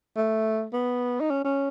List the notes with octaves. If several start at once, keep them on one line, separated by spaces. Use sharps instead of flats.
A3
B3
D#4
C#4
C#4